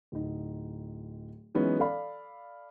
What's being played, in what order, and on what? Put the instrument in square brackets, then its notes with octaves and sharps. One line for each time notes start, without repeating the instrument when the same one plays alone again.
[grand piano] D1 D#4
E3 F#3 G#3 B3 C#4 D#4
A4 D5 F5 B5